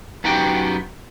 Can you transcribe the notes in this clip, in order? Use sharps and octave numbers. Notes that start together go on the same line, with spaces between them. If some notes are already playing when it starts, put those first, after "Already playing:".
F#2 B3 D#4 F#4 G4 G5